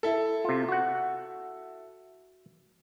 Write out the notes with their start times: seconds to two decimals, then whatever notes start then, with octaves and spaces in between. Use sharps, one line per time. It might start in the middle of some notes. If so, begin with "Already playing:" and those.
0.03 E4 A4
0.44 C3 F4
0.69 F#4 F#5